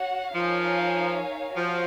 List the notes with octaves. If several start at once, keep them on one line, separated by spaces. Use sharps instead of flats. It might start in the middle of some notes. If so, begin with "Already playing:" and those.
Already playing: F#4 C#5 F#5
F3 D#4 A#4 C#5 F5 G#5
F3 F#4 C#5 F5